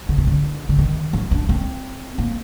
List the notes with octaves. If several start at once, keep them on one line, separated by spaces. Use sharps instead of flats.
D3
C3
D3
D3
D#3
F#3
D4
C4
A#3